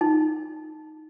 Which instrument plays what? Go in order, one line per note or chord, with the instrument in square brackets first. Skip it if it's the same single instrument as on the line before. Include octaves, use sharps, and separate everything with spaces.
[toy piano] D#4